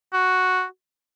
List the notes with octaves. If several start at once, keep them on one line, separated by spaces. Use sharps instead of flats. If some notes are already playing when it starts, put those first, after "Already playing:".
F#4